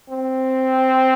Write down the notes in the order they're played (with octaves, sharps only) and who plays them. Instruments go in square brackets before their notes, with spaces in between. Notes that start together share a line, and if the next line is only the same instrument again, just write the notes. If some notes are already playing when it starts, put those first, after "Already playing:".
[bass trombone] C4